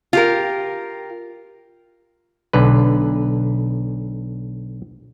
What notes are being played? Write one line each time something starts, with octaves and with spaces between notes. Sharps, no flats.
F4 G4 A#4
B1 D3 B4